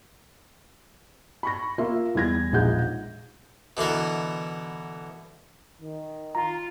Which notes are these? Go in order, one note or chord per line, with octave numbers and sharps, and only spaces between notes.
B5 C#6 A#6
A#3 F4 E5
E2 G3 G#6 A#6
E1 A#1 D#4 G#4 F#5 G6
B2 D3 E3 A#4
D#3
F4 A#5